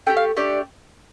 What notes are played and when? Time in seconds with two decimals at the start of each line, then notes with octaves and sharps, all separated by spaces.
0.07 A3 D4 G4 G5
0.17 F5
0.36 A3 D4 G4 D5